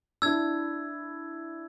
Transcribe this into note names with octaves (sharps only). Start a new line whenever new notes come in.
D4 E4 E6 G#6